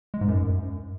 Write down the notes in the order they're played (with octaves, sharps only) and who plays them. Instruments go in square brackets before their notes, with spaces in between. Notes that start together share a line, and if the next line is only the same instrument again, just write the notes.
[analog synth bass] G#3
G#2
F#2